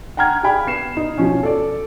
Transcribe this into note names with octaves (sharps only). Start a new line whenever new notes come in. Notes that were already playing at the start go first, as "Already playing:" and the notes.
F#5 G5 A#5 F6 G#6
G4 G#4 D5 F5 G5 B5
B3 C7 E7
D#4
B2 F3 C#4
A4 D5